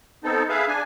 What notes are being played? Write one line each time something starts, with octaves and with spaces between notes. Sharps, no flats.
B3 C4 D#4 A4
G#4 B4 E5 F5
D4 G#5